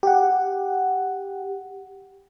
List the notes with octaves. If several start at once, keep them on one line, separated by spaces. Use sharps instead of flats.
G4 F#5